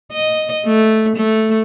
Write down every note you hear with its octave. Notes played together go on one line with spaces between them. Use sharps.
D#5
A3
A3